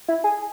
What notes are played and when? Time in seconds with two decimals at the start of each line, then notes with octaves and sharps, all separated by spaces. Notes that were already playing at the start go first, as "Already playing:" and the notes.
0.08 E4
0.24 G#4